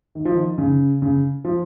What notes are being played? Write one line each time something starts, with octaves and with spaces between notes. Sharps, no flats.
D#3
F3
D#3
C#3
C#3
F3